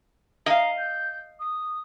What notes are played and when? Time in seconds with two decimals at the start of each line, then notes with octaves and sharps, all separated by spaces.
0.46 D#5 F5 A#5
0.78 G6
1.40 D#6